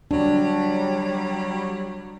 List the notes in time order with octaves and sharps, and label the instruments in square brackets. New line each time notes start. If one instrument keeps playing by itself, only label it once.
[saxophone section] F#3 G3 [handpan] D4